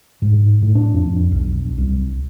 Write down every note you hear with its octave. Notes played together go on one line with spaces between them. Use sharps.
G#2
A2
D4
F2
B1
C2